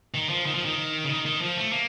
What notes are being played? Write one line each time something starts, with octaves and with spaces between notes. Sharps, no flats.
D#3
F3
D#3
F3
D#3
C#3
D#3
D#3
F3
A3
A#3